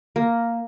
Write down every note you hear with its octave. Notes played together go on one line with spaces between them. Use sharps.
A#3